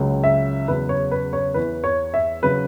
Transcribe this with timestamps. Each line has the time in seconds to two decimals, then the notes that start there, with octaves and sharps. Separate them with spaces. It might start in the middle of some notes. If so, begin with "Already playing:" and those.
Already playing: C#2 C#3 F#3
0.24 E5
0.68 E2 C#3 F#3 B4
0.89 C#5
1.11 B4
1.33 C#5
1.54 E2 E3 B4
1.84 C#5
2.14 E5
2.42 C#3 F#3 B4